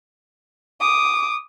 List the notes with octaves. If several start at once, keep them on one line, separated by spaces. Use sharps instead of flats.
D6 D#6